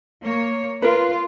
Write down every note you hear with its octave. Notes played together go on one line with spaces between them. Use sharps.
A#3 C#5
F4 A#4 B4